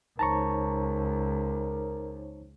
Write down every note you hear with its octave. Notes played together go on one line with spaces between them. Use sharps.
C#2 D#4 A#4 C5 C#5 A5 A#5 C#6